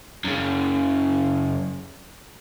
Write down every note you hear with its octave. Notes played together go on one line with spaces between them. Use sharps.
F#2 C#3